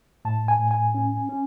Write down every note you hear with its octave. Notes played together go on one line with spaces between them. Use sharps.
A2 A5
G#5
A2
G#5
C#4
C#4